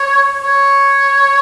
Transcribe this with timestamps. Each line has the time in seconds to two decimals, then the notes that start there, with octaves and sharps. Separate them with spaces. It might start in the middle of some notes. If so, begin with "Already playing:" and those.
Already playing: C#5
0.44 C#5